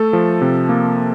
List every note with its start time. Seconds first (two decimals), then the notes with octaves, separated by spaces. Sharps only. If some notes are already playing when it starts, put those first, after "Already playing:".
Already playing: A3 A4
0.13 F3
0.41 C3
0.69 A#3